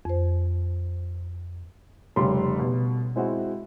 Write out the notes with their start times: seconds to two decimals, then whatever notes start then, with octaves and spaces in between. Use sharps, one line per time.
0.05 F2 C5
2.16 F1 C#3 G3 C6
2.59 B2
3.16 G#3 C4 E4 F#4